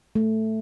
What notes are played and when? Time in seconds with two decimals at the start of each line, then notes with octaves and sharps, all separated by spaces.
0.15 A3